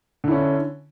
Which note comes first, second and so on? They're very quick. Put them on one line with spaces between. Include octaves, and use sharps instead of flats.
D3 E4 C#4